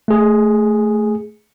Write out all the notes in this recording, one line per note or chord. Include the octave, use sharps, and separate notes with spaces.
A3 G#4